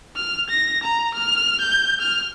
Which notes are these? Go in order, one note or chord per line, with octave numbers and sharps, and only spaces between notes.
F6
A#6
A#5
F6
G6
F6